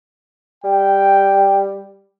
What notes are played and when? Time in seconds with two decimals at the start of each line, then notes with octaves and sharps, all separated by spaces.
0.64 G3 G5